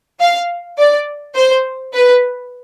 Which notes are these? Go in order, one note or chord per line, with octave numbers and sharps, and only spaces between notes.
F5
D5
C5
B4